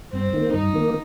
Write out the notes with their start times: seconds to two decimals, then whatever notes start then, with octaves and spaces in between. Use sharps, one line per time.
0.13 G2 C4
0.33 D#3 A#3
0.53 G2 D#4
0.74 D#3 A#3